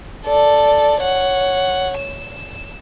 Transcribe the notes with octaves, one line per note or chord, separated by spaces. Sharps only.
A4 D5
C#5 F#5
E7